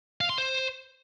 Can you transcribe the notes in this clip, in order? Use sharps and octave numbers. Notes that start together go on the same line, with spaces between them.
F5
C6
C5